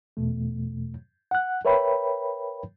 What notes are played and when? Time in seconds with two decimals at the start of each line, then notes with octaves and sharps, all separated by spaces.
0.17 E2 B2 A3
1.31 F#5 F#6
1.65 A#4 B4 C#5 E5 G5 B5